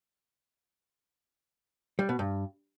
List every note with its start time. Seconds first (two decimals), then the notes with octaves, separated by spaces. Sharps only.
1.99 G3
2.09 B2
2.19 G2